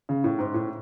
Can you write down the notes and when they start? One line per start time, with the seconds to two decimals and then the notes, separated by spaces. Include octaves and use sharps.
0.09 C#3
0.24 A2
0.39 G#2
0.54 A2